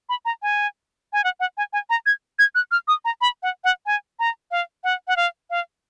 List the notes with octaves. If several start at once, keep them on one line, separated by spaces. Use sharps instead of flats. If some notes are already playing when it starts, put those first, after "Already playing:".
B5
A#5
G#5
G#5
F#5
F#5
G#5
G#5
A#5
G#6
G#6
F#6
F6
D#6
A#5
B5
F#5
F#5
G#5
A#5
F5
F#5
F#5
F5
F5